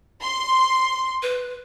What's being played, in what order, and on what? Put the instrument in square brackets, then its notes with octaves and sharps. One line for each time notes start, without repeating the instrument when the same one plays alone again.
[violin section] C6
[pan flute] B4